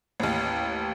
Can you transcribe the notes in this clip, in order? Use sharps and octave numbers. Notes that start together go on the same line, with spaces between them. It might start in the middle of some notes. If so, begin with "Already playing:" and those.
A1 D#2